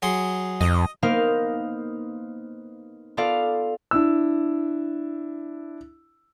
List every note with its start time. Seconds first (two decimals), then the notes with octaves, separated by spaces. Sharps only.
0.02 F#3 G#4 C6
0.61 F2 D#5
1.03 A#3 B3 D#4 A#4 C5 F5
3.17 B3 F4 A4 D5 F5
3.91 D4 E4 E6